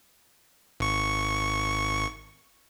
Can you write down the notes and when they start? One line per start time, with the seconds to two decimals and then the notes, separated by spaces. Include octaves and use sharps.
0.80 G#1 C#6